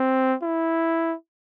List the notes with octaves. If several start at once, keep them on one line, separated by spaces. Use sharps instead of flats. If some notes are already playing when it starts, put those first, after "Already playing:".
Already playing: C4
E4